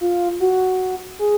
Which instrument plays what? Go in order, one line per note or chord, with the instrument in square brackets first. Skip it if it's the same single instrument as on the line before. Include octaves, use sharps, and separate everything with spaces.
[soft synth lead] F4
F#4
G#4